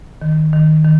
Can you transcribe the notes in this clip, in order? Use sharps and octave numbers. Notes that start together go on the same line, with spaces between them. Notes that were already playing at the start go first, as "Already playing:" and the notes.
D#3
D#3
D#3